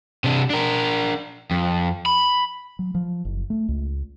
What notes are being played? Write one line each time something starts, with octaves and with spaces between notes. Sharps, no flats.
C3 D4
D4 A#4
F2
B5
F#3
F3
F#1
A3
C#2